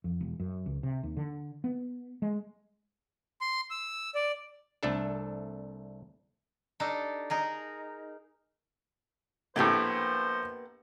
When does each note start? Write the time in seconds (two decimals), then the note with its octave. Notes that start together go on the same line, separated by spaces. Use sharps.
0.04 F2
0.21 E1
0.40 F#2
0.66 C#2
0.83 C3
1.03 D#2
1.17 D3
1.64 B3
2.22 G#3
3.41 C6
3.71 E6
4.15 D5
4.83 C2 A3 D4 A4
6.80 D4 D#4 G4 A4
7.30 D#4 G#4 A#4
9.56 A#1 A2 A#3 B3 G4 C5